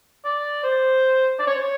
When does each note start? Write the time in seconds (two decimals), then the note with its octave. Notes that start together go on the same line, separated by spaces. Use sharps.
0.25 D5
0.63 C5
1.39 D5
1.47 C#5
1.55 C5
1.62 C#5